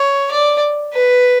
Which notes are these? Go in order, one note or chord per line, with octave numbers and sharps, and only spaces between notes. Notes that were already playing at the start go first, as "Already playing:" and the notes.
Already playing: C#5
D5
B4